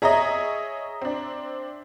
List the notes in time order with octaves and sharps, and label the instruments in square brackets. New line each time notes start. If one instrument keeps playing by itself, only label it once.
[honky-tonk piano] G#4 C#5 D#5 [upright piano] E5 A#5
[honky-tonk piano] C4 D4